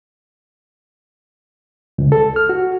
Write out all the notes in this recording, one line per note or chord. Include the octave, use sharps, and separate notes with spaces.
C#2
A4
F6
F#4